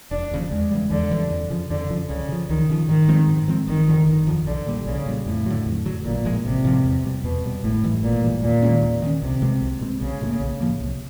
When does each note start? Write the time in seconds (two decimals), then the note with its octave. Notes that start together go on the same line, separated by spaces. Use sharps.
0.11 E1 D4
0.31 D#2 C#3 F3
0.51 E2 G#3
0.71 C#3 E3 G3
0.91 E2 D3
1.11 C#3 E3 G3
1.30 F2
1.50 C#3 F3
1.70 F2 D3
1.90 C#3 F3
2.09 C#2 C#3
2.29 C#3 F3
2.49 C#2 D#3
2.70 C#3 F3
2.89 G#2 D#3
3.08 F3 G#3 C4
3.28 G#2
3.48 F3 G#3 C4
3.68 G1 D#3
3.87 F2 D3 F3
4.07 G1
4.27 F2 D3 F3
4.47 B1 D3
4.67 A#2 G3
4.87 B1 C#3
5.06 A#2 G3
5.26 F2 A2
5.46 D3 F#3
5.66 F2
5.86 D3 F#3
6.05 A1 A#2
6.25 A2 F3 G#3
6.45 A1 C3
6.65 A2 F3 G#3
6.84 E2
7.04 B2 G3
7.24 E2 B2
7.44 B2 G3
7.64 G#1 A2
7.83 G#2 E3 G3
8.03 G#1 A#2
8.23 G#2 E3 G3
8.43 D#2 A#2
8.62 D#3 G#3 C#4
8.82 D#2
9.02 D#3 G#3 C#4
9.22 C2 C3
9.42 B2 G#3 C4
9.62 C2
9.81 B2 G#3 C4
10.01 B1 C#3
10.21 A2 F3
10.25 A#3
10.40 B1
10.60 A2 F3 A#3
10.80 C2